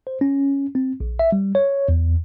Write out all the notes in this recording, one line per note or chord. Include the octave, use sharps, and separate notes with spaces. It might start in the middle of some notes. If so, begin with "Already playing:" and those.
C5
C#4
C4
A#1
E5
G3
C#5
E2